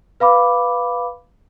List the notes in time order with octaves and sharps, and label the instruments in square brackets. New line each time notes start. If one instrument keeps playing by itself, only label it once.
[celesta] B4 F5 B5 D6